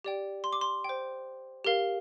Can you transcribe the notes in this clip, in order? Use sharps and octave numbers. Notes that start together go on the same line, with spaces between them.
G4 D5 G5
C6
D6
C6
C5 G5
G4 A#4 F5